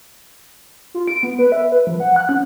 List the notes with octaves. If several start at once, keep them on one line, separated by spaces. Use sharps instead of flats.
F4
D7
B3
B4
E5
B4
F3
F#5
F#6
C#4